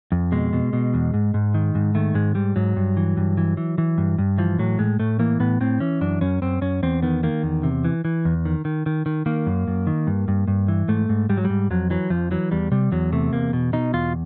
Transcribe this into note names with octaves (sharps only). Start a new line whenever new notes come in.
F2
B2 G#3
B2
B2
E2
G#2
G#2
D#3
G#2
D#3 A3
G#2 G#3
G#2 G3
G#2 F#3
G2
E3
G2
E3
E3
E3
G2
G2
E3 F3
A2 F#3
A2 G#3
A2 A3
E3 A#3
A2 B3
A2 C4
E3 C#4
F#2 D4
F#2 C#4
F#2 C4
F#2 C#4
E2 C4
D#3 B3
D#3 A#3
E2
C3
E3
E3
E2
D#3
D#3
D#3
D#3
D#3 A#3
F#2
F#2
D#3
G2
G2
G2
E3
G#2 A3
G#2
G#2 G3
F#3
G#2 G3
F2 F#3
E3 F#3
F2 F3
E3 F#3
E2 G3
C3 G3
E2 F#3
C3 A3
E2 A#3
B2
B2 D#4
E2 F4